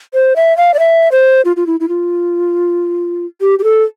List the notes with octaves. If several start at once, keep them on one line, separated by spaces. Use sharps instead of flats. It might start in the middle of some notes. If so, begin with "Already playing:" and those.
C5
E5
F5
D5
E5
C5
F4
F4
E4
E4
F4
G4
G4
A4